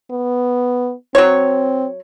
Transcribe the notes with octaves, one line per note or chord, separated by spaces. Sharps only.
B3
F#3 C4 C#5